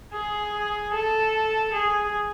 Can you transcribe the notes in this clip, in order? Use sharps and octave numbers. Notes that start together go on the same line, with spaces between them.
G#4
A4
G#4